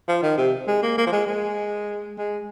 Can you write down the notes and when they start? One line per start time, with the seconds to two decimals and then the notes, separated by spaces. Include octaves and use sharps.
0.08 F3
0.23 D#3
0.38 C3
0.67 G#3
0.83 A#3
0.98 A#3
1.06 F3
1.12 G#3
1.27 G#3
2.18 G#3